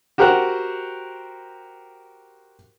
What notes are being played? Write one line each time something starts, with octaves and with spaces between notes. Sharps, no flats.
F#4 G4 A#4 C5 F#5 F#6